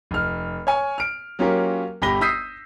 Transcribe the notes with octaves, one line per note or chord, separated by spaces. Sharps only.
F1 F6
C#5 G#5
F6 D7
F#3 A#3 C#4 F4 G4 A#4
G1 G4 B5 A#6 G7
D#6 E6 G6 B6 C7 D#7